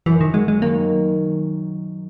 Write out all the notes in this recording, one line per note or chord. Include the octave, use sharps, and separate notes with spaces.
F#2 E3
D#3
F#3 G#3
G#3
D#3 A#3